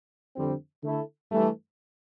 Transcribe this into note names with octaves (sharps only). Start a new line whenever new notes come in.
F2 D3 G3 C4
D3 A3 E4 A4
G2 E3 A3